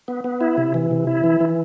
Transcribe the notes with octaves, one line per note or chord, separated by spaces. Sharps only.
B3
B3
E4
C3
E3
C3
E4
E3
E3